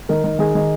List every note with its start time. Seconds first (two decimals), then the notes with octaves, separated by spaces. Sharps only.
0.09 D#3 A#4
0.24 D#3
0.39 D#3 G#4
0.55 D#3